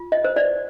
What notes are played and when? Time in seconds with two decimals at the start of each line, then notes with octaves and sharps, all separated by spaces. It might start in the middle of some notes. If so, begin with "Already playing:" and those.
Already playing: F4
0.12 D#5
0.24 C5
0.36 D5